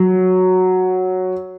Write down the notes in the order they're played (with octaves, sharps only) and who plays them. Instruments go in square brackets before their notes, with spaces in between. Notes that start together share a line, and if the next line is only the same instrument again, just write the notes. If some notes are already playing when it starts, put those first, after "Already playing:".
Already playing: [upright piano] F#3